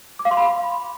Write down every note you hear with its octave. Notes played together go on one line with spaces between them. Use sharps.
D6
F5
C6
B5